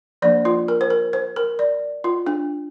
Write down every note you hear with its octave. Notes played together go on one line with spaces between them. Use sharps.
F3 A#3 D4 D5
F4
A#4
C5
A#4
C5
A#4
D5
F4
D4